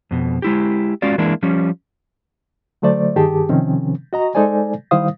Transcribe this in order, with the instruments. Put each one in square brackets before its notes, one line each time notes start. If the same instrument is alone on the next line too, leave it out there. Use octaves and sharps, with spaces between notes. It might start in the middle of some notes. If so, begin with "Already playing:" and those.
[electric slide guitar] F2 B2
G#3 E4 G4
G#3 C#4 F4 F#4 D5
E3 G#3 A#3 D4 E4
F3 G3 C#4
[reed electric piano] D3 F#3 A3 C5 D5
G2 D#3 G4 G#4 A5
C3 D#3 F3 C4 C#4
F#4 D#5 A#5
G#3 D#4 A4 C5 D5 G#5
D#3 G3 E4 C5 F5 D#6